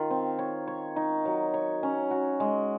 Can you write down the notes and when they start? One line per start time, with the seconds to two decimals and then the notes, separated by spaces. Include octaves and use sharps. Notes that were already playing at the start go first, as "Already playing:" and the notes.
Already playing: D#3 F4
0.11 C4
0.39 C#5
0.67 C#5
0.96 D#4
1.25 F#3
1.54 C#5
1.83 C#4
2.11 F#4
2.40 G#3